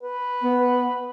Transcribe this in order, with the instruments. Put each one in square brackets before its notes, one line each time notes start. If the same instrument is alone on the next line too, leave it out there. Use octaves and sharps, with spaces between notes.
[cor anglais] B4
[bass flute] B3